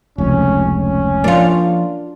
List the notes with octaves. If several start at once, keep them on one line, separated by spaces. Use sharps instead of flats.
F1 C#2 C#4
C#4
F3 A#3 D4 F4